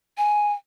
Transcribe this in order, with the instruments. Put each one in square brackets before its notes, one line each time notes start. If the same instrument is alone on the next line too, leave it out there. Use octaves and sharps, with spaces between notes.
[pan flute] G#5